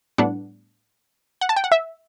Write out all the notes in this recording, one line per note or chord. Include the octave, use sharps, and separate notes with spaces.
A2 G3 B3 D4 F#5
F#5
A5
G5
F#5
E5